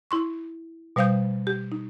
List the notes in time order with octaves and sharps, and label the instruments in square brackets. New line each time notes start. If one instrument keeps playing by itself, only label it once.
[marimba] E4 C6 C#6
B2 G3 C5 F5 D#6 G6
G4
D#4